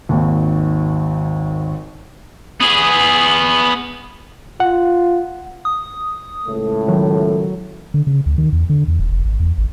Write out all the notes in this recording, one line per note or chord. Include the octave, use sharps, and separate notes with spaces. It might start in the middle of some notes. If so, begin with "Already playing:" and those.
G#1 D#2
B3 G#4
F4 F#5
D#6
C#2 A2 A3
D#3 F#3
D3
C#3
D2
D#3
E2
D3
E2
D#1
F1
G#1
E2
G#1